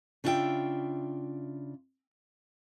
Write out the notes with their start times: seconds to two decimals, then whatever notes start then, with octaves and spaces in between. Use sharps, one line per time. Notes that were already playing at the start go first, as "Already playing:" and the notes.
0.24 C#3 D4 F4 F#4 E5 G5